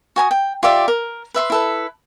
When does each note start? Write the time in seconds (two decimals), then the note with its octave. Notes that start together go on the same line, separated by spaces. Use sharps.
0.16 F#4 G#5 A#5 D#6
0.31 G5
0.63 F4 G4 D5 E5
0.88 A#4
1.34 B4 E5 B5 C6
1.50 E4 A4 B4